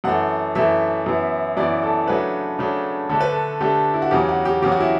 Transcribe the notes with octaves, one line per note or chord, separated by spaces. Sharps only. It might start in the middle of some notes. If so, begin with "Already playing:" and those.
F#2 E3 A3 F#5
F#2 E3 A3 E5
F#2 E3 B3 E4
F#2 E3 B3 E4 D5
A4
C#3 F#3 A3 D4 B4
C#3 F#3 A3 D4
D3 A3 D4 A4
B4
A4
D3 A3 D4 G4
E4
F#4
E2 C#3 F#3 G4
F#4
G4
E2 C#3 F#3 G4
F#4
E4